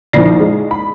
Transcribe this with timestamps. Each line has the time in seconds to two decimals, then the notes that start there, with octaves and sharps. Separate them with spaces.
0.13 A#1 D#3 F3 D#4 E4 D5
0.40 G#3
0.71 B5